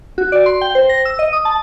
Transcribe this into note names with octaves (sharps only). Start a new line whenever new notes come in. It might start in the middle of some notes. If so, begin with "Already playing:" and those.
F#4
D5
C6
G5
C5
A#6
E6
D#5
D#6
A5